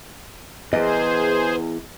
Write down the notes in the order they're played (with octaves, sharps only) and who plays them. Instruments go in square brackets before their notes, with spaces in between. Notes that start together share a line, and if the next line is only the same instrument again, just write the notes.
[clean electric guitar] E2 [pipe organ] G#4 C5 [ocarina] B4 [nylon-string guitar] D#5